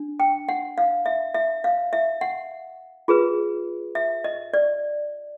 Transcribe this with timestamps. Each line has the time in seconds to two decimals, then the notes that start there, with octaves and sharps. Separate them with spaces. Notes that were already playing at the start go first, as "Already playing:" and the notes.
Already playing: D4
0.20 G5
0.49 F#5
0.78 F5
1.06 E5
1.35 E5
1.64 F5
1.93 E5
2.21 F#5
3.08 F4 G#4 B4
3.95 E5
4.24 D#5
4.54 D5